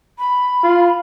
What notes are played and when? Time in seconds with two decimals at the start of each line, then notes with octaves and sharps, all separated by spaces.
0.19 B5
0.63 F4